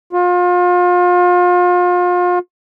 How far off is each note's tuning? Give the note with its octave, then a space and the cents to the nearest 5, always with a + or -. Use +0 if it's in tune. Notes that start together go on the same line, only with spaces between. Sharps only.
F4 +35